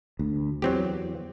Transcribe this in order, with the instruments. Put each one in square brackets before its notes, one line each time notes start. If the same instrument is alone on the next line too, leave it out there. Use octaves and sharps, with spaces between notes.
[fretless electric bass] D2
[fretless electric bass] E2 [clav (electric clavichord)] F#3 C4 G4